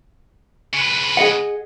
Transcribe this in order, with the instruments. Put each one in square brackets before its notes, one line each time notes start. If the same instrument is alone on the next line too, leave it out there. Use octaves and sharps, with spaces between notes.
[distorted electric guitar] C#3 B4
[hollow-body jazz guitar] G#4 D#5 F#5